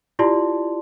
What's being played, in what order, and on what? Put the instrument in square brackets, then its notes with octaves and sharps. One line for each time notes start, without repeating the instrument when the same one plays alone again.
[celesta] E4 F4 G4 D5 A5 C6